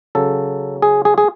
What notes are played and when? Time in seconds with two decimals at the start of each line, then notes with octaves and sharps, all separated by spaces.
0.15 C#3 F#3 A4
0.82 G#4
1.05 G#4
1.18 G#4